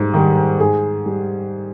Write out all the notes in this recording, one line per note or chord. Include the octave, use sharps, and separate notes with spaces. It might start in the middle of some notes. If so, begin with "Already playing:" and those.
Already playing: G#2 G3
D#3 G3
G#2 G#4
G3